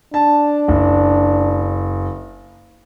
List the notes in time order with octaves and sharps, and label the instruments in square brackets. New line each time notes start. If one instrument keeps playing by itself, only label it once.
[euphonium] D4 [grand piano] A5
[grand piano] F#1